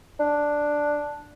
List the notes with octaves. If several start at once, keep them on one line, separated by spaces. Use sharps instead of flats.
D4